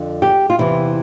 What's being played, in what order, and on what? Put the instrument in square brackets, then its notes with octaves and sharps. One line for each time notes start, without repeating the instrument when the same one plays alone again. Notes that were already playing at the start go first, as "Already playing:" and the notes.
Already playing: [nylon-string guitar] F2 D3
G4
F4
E2 C3 E3 E4